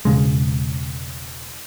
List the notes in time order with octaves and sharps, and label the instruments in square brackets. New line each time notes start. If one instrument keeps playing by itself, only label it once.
[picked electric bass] E1 C#3 G#3